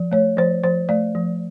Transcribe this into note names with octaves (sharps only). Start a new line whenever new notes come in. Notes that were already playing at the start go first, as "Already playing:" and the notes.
Already playing: F3
A3 C#5
F3 C5
F3 C5
A3 D5
F3